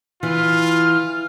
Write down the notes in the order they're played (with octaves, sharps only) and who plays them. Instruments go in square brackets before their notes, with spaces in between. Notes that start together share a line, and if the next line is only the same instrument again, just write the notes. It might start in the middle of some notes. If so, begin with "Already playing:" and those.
[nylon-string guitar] E3 [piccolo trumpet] F4 [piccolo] F6